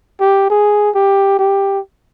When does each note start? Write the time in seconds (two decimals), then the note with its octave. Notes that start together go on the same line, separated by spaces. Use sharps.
0.20 G4
0.50 G#4
0.95 G4
1.39 G4